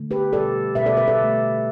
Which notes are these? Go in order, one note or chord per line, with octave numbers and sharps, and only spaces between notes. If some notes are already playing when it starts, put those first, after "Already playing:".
Already playing: D3 A3
G4 B4
B2 G3 A4 D5
B2 G3 B4 E5
A4 D5
B4 E5
A4 D5
D3 A3